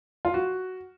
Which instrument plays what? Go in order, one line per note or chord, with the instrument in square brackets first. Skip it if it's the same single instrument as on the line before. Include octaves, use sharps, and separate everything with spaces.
[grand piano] F4
F#4